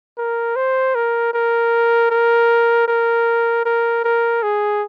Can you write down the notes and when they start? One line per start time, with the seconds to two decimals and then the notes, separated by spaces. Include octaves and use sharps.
0.18 A#4
0.56 C5
0.95 A#4
1.33 A#4
2.11 A#4
2.88 A#4
3.65 A#4
4.04 A#4
4.43 G#4